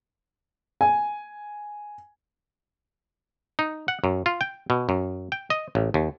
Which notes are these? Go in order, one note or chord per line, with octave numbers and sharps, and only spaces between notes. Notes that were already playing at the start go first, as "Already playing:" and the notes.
G#5
D#4
F#5
F#2
F4
G5
B2
F#2
G5
D#5
A1
D#2